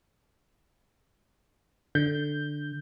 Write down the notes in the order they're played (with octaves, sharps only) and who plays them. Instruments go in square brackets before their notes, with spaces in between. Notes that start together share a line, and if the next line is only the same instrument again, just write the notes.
[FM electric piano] D3 G6